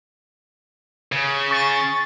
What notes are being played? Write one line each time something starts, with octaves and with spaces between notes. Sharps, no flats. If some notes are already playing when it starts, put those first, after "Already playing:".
C#3
C#6 A6